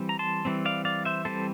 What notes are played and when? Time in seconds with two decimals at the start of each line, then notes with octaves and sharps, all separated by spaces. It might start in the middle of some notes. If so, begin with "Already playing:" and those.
Already playing: E3 G3 C4
0.09 A#5
0.19 A5 C6
0.45 E3 G3 C4
0.65 D5 F5
0.85 D5 F5
1.05 C5 E5
1.25 E3 G3 C4 A4 C5